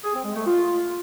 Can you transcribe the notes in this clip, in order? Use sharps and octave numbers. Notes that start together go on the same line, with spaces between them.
G#4
C4
G#3
A3
F4